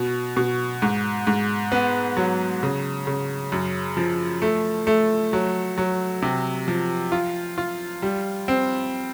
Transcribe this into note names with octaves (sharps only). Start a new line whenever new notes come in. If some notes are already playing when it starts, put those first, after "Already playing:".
Already playing: B2
B2
G#2
G#2
B3
F#3
C#3
C#3
F#2
F3
A3
A3
F#3
F#3
C3
F3
F4
F4
G3
C4